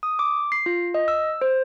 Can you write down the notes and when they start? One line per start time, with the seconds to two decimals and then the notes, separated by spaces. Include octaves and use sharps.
0.03 D#6
0.19 D6
0.52 C7
0.66 F4
0.94 D#5
1.08 E6
1.41 C5